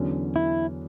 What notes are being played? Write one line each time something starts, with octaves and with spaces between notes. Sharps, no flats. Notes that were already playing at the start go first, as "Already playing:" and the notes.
Already playing: E2 D3 F#3 C#4
E4